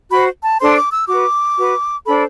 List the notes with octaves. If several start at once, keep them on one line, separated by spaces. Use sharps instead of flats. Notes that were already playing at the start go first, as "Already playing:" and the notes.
F#4 C5 B5
A5
D4 A4 C5 C6
D6
E6
F#4 B4 D6
F#4 B4
D4 A4 C5 B5